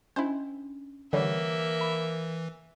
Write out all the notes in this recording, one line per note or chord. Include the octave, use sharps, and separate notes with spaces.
C#4 D4 E4 C5 D#5
D3 E3 G3 A#3 G4 C#5 E5 F#5
B5